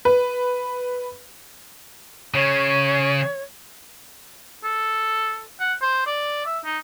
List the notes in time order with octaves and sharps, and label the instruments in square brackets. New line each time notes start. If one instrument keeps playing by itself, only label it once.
[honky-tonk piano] B4
[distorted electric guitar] C#3 [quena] C#5
[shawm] A4
F#5
C5
D5
E5
D#4